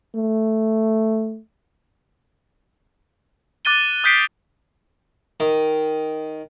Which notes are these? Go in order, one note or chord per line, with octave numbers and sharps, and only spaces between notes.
A3
D6 F#6 A6 D#7 G7
D#6 F#6 G6 B6 C7 D7
D#3